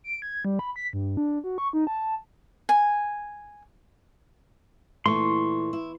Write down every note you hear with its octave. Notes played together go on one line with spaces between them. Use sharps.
D7
G#6
G3
B5
B6
G2
D4
F#4
C#6
D#4
A5
G#5
A#2 E3 A3 C6 C#6
E4